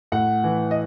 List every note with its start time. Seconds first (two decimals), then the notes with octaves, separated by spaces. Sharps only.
0.12 A2 F#5
0.44 E3
0.71 D#5